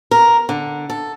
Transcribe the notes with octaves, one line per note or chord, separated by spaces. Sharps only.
A#4
D3
A4